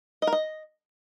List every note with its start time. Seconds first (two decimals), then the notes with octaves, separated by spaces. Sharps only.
0.22 D#5
0.27 A#4
0.32 D#5